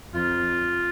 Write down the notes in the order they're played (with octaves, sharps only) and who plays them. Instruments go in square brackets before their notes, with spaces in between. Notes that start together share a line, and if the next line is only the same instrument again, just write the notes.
[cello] F2 [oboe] F4